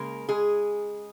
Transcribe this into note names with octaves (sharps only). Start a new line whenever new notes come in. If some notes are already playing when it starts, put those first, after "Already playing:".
Already playing: C#3 G#3 A#3 A#4
G#3 G#4